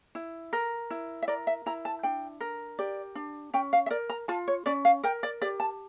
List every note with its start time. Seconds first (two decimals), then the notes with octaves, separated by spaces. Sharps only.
0.15 E4
0.53 A#4
0.90 E4
1.22 E5
1.28 A#4 D5
1.47 E5
1.66 E4 A#5
1.85 A5
2.03 D4 G5
2.41 A#4
2.79 G4 D5
3.15 D4
3.54 C#4 G5
3.73 F5
3.86 E5
3.90 A#4 D5
4.10 A#5
4.28 F4 A5
4.48 C#5
4.66 C#4 D5
4.85 F5
5.03 A#4 G5
5.23 D5
5.42 G4 D5
5.60 A5